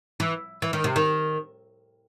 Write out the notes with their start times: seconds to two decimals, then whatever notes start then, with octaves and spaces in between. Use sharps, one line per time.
0.20 E3
0.62 E3
0.73 D#3
0.84 C3
0.96 D#3